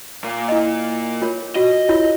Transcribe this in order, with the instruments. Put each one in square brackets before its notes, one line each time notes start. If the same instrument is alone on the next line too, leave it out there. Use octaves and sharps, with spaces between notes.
[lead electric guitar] A#2 A#3
[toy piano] E4 D#5
F4 A#4 C#5
[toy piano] F4 F#4 [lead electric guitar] D#5
[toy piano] E4 F4 C#5